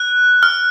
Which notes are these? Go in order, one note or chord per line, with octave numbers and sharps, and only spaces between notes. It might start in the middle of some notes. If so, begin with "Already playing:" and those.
Already playing: F#6
F6